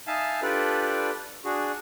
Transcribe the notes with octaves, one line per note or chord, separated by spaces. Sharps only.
D#4 E5 F5 G#5 A5
D4 F4 G4 A4 B4 D5
D4 F#4 G#4